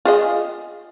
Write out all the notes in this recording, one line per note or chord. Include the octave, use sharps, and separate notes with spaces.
F4 G#4 D#5